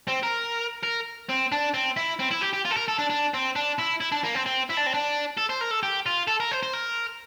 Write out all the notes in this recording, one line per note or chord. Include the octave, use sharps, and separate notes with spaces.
C4
A#4
A#4
C4
D4
C4
E4
C4
E4
G4
G4
F4
A4
A#4
A4
D4
D4
C4
D4
E4
E4
D4
A#3
C4
C4
E4
D4
C4
D4
A4
C5
A#4
A4
G4
F4
A4
A#4
C5
C5
A#4